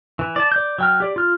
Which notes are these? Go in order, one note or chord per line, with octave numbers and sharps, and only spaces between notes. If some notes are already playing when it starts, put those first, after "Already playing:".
E3
D5 A5
D5 G6
F#3 G5 F6
G4 D5
F4 F6